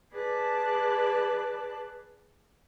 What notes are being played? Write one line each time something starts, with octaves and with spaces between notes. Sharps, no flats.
G#4 B4 D5 A5 F#6